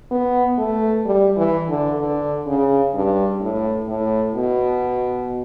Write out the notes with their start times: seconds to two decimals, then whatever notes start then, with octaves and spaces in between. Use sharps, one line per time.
0.11 B3
0.58 A3
1.05 G3
1.37 E3
1.68 D3
2.00 D3
2.47 C#3
2.94 G2
3.41 A2
3.88 A2
4.35 B2